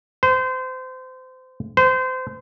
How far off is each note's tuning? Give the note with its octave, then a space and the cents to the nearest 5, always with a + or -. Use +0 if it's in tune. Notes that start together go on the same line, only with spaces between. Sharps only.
C5 -30
C5 -30